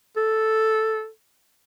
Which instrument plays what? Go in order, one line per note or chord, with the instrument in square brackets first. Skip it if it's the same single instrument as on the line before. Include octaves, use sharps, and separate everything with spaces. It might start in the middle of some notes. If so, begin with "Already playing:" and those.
[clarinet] A4